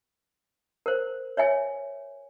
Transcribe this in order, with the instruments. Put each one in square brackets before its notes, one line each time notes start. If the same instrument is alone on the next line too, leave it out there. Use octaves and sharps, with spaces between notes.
[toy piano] A#4 C5
C#5 E5 G#5